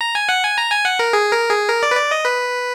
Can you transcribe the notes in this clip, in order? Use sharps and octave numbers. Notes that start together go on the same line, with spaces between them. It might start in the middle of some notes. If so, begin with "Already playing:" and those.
A#5
G#5
F#5
G#5
A#5
G#5
F#5
A#4
G#4
A#4
G#4
A#4
D5
B4
D5
D#5
B4